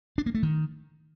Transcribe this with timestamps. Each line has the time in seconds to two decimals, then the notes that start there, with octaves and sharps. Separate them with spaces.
0.18 D4
0.26 A#3
0.35 A3
0.43 D#3